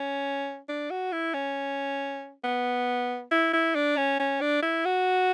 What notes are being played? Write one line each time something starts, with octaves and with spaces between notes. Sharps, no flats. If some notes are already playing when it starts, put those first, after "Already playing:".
Already playing: C#4
D4
F#4
E4
C#4
B3
E4
E4
D4
C#4
C#4
D4
E4
F#4